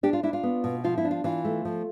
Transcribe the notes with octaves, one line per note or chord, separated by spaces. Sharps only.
D4 G4
F4
D4 E4
F4
B3
B2
F3 F4
E4
D4
F4
E3 F4
A3
F3